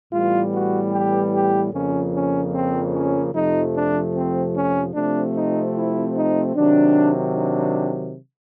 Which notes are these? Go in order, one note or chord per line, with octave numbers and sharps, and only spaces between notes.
A2 E3 G3 B3 F4
F#4
G4
G4
F2 C#3 F3 A#3 C#4
C#4
C4
C#4
F2 C3 F3 A3 D#4
D4
C4
C#4
C3 F3 A3 C4 D4
D#4
E4
D#4
C3 D#3 F#3 D4
D4